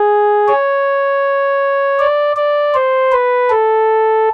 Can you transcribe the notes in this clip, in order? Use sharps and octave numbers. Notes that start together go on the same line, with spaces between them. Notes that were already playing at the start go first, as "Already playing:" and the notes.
Already playing: G#4
C#5
D5
D5
C5
B4
A4